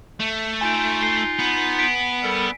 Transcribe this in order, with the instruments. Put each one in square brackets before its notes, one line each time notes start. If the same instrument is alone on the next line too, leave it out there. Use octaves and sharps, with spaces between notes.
[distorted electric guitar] A3
[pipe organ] D#4 F4 [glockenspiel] G#5 D7
[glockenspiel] C7 G7
[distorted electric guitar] B3
[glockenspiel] B6 D7
[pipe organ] G3 A4 A#4